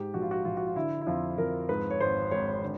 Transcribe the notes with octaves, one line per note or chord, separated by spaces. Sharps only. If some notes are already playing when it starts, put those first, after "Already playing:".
Already playing: G#2 G4
A#1 F#4
F4
F#4
A#1 F4
F#4
F4
D3 E4
E4
F2 F4
F2 A#4
G#2 B4
C#5
G#1 C5
G#1 C#5
C#5
D3